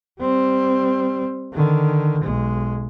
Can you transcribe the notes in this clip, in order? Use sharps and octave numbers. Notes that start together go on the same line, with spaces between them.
G3 C4
D3 D#3
B1 G#3